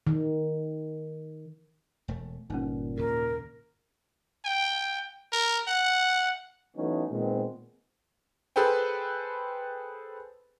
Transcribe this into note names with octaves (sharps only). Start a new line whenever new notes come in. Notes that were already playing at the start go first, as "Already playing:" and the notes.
D#3
E1 A3
G1 A#2 C#4 D#4
D#2 G#2 C#3 A#4
G5
A#4
F#5
E3 F#3 A3 B3 C#4 D#4
A#2 D#3 G#3 B3 C4
G#4 A4 B4 C5 G5